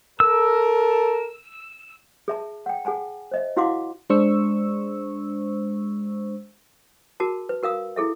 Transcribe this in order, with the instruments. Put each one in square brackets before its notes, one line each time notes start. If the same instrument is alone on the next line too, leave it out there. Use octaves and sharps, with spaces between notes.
[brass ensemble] A4 A#4 [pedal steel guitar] E6
[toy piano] G#4 E5 A5
F#5 G5
G#4 F#5 G#5 A5
C5 D#5 E5
E4 F#4 F5 F#5 C6 D6
[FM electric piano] G#3 D4 C5 C#6 E6
[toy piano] F#4 G#4 A#4 A5
B4
F#4 A#4 F5 D#6
E4 G#4 A4 E5